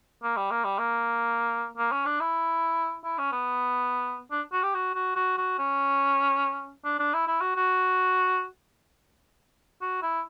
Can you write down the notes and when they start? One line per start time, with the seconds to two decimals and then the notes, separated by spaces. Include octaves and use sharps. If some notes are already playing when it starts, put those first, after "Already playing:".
0.23 A#3
0.37 G3
0.51 A#3
0.64 G3
0.79 A#3
1.77 A#3
1.92 C#4
2.06 D4
2.20 E4
3.04 E4
3.18 C#4
3.32 B3
4.31 D4
4.53 F#4
4.63 G4
4.74 F#4
4.95 F#4
5.16 F#4
5.37 F#4
5.58 C#4
6.85 D4
6.99 D4
7.13 E4
7.27 E4
7.41 F#4
7.56 F#4
9.81 F#4
10.02 E4